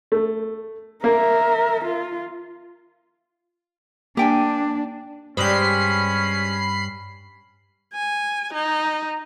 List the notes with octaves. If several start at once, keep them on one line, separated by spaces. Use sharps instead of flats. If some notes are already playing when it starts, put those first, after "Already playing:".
A3
A#3 A#4 E5
F4
A#3 D4 G4 G5 G#5
G2 G3 G#3 C#4 G4 C5 B5 C7
G#5
D#4